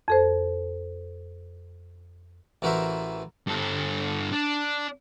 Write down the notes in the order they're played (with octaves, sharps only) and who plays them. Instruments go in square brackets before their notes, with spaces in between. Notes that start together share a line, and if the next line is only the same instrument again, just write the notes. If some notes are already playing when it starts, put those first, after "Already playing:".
[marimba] F2 A4 C5
[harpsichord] A1 E3 F#4 A#4 C5 E5
[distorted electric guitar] G2 A4
D4